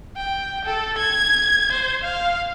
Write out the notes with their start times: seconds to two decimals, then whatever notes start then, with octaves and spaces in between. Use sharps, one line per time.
0.17 G5
0.65 A4
0.98 G#6
1.72 C5
2.03 F5